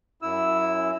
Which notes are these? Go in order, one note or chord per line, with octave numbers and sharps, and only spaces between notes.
F#2 E4 E6